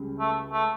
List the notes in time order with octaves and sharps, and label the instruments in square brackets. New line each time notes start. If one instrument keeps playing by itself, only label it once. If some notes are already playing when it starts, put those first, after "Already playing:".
Already playing: [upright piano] C#2 C#3 G3
[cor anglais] A3
A3